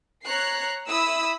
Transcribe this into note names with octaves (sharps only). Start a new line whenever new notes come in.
C#5 A#5 F#6 C7
E4 B5 D#6 E6